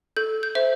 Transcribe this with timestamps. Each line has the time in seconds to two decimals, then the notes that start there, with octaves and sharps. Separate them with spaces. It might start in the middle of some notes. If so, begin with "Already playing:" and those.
0.17 A4 G6
0.43 G6
0.55 C5 E5